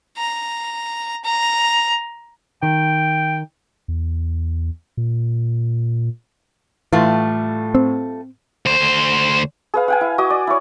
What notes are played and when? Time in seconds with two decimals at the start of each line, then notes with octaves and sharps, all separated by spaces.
0.18 A#5
1.24 A#5
2.63 D#3 G5
3.88 E2
4.97 A#2
6.93 A2 E3 G3 A3 F4
7.75 C4
8.66 D2 C5
9.74 G#4 B4 F5
9.88 F5 G5 G#5
10.01 E4
10.18 F#4 D#5 D6 D#6
10.30 D5
10.47 E4 C#5